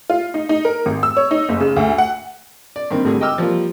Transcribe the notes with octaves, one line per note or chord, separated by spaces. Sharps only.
F4
D#4
D#4
A#4
G#1
E6
C#5
D#4
F#1
C#3
D2
F#5
D5
G2 D#3 A#3 C4
G#1 A2 D3 G3 G#4
D#5 G5 D6 E6 F6
F3 G3 A#3 F4